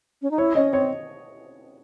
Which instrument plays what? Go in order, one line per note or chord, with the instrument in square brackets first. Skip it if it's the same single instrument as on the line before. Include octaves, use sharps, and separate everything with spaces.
[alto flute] C#4
D#4
[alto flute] E4 [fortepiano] C#5
[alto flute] C#4 [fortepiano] D#5
[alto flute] C4 [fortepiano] C#5